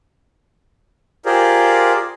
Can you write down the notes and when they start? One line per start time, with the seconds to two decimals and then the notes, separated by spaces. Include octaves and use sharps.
1.26 F4 G4 G#4 A#4 C5 D5